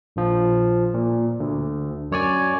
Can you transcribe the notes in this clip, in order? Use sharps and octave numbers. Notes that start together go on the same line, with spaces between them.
A#1 F3
A#2
D2
F#2 C#5 D5 G#5